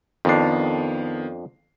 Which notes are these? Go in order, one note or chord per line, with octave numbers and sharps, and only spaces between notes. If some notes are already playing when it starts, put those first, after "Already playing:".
F2 D#3 B3 D4 C7